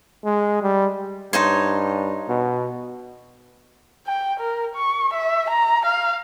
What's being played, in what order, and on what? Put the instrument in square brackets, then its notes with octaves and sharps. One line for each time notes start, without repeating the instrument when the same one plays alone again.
[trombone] G#3
G3
[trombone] G2 [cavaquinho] D#4 C5 C#5
[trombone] B2
[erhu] G5
A#4
C#6
E5
A#5
F5